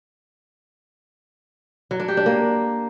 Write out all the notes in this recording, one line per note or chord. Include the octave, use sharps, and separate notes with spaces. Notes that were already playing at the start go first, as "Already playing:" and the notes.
F#3
D4
G4
D4
A#3